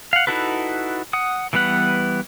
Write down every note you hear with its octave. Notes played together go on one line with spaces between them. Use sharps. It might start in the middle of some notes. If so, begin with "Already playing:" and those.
F5 F#5
D#4 E4 F#4 A4 B4
F#5 D#6
E3 G3 B3 B4 F#5